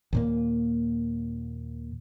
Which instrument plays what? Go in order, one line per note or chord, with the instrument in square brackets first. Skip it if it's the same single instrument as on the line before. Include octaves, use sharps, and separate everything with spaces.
[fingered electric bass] D#2 A#2 A#3